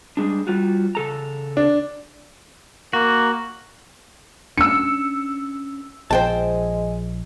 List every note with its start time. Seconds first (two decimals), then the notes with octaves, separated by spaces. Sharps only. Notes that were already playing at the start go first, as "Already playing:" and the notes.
0.17 G3 G#3 D4
0.47 G3 F4 F#4
0.95 C#3 A4 A#5
1.57 D4
2.93 A#3 F#4
4.58 C#4 D4 E6 C#7
6.11 A#1 F3 G#3 C5 G5 A5